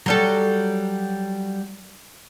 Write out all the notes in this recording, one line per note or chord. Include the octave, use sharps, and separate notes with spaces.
F#3 G3 A4